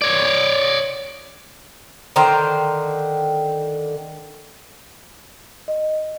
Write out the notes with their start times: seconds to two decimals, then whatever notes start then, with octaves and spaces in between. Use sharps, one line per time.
0.02 C#5 D5
2.16 D3 D#3 C5 A#5
5.68 D#5